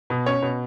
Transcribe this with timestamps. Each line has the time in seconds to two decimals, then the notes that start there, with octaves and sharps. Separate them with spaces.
0.10 B2
0.26 C#4 C#5
0.42 B2